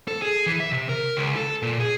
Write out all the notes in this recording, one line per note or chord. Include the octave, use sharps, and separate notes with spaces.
A4
G#4
E3
E5
C3
A#4
C#2
A4
A#2
G#4